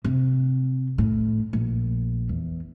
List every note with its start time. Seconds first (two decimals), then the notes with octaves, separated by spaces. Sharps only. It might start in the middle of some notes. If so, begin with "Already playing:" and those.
0.04 C3
0.98 A2
1.53 A#1
2.29 E2